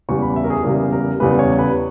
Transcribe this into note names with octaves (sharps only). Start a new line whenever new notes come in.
E2 C#3 G3 C#6
B5
E5
A#4
G#4
E2 C#3 G3 A#4
A#4
E2 C#3 G3 B4
C#5
B4